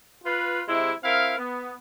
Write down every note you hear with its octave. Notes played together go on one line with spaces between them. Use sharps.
F4 B4
C3 G#3 E4
C4 E4 A#4 F5
B3